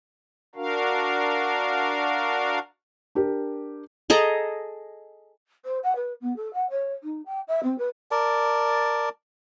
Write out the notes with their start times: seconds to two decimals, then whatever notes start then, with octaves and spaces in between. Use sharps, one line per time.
0.55 D4 F#4 A#4 F5
3.15 D4 G4 A#4
4.10 G#4 A4 D#5 A#5
5.64 C5
5.83 F#5
5.95 B4
6.20 B3
6.36 A4
6.53 F#5
6.69 C#5
7.03 D#4
7.25 G5
7.47 E5
7.63 C4
7.78 B4
8.11 A#4 D5 A5